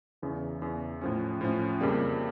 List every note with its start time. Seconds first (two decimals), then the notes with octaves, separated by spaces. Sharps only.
0.22 E2 C#3 E3
0.62 E2 C#3 E3
1.01 A2 F3 C#4
1.41 A2 F3 C#4
1.81 F2 C#3 G3 A#3